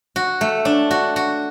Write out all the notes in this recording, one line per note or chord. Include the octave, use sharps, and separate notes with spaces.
F#4
A3
D4
F#4
F#4